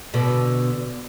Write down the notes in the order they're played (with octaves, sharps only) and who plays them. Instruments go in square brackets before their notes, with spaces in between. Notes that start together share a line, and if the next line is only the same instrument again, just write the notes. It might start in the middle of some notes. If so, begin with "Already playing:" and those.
[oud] B2 D3